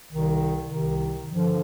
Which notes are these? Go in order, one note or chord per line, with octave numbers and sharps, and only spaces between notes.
C2 C3 D#3
C2 C3 D#3
G2 D3 F3